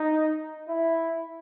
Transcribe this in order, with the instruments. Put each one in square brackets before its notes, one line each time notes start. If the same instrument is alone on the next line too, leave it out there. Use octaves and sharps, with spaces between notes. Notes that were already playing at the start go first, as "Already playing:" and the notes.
Already playing: [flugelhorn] D#4
E4